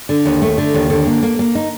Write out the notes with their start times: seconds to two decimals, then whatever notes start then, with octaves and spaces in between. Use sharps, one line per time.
0.09 D3
0.26 D#2
0.42 A3
0.58 D3
0.74 D#2
0.90 D3
1.07 A#3
1.23 A#3
1.39 A#3
1.55 D#4